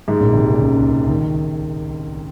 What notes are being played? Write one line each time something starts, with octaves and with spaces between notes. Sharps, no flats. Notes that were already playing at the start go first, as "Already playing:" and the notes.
G#2
A#1 A#2
C2 C3
C#2 C#3
C#2 C#3
D#3